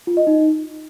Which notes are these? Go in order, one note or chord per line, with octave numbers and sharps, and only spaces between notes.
F4
D#5
D#4